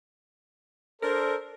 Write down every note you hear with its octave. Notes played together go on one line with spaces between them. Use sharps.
D4 A4 A#4 C5